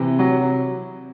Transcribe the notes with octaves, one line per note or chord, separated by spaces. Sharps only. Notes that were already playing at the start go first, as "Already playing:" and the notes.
Already playing: C3 E3
F#3